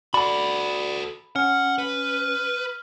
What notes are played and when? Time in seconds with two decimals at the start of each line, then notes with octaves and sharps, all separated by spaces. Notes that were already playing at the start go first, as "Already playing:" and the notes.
0.14 F#4 A4 D5 B5
1.36 C#4 F#5 F6
1.78 B4